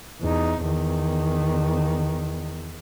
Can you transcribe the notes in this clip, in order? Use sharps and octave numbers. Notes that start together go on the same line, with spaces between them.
E2 D#4
E2 D#3